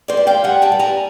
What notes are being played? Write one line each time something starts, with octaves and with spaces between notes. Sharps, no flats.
C5 D5
G3
F5 G5
G3 F#5 G#5
G5 A5
G3
G#5 A#5